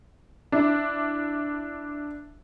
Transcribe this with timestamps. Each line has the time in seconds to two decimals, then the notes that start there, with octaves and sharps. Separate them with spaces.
0.52 D4 E4